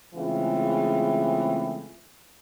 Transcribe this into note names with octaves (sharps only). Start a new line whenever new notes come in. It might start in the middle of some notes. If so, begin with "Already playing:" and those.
C#3 E3 G#3 A3 C4 F4